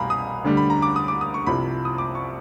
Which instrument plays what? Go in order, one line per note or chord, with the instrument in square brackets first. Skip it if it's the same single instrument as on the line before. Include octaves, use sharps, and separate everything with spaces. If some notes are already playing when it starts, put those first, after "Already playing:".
Already playing: [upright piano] C2 B2 G3 F5 G#5 A#5 B5
D#6
D2 D3 G3
B5
A#5
D6
D#6
D6
D#6
C#6
C2 C3 F3 B5
D#6
D6
C#6